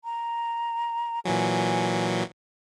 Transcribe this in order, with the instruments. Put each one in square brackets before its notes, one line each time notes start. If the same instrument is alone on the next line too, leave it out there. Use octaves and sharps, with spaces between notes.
[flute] A#5
[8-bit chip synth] A#2 E3 F#3 [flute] G#5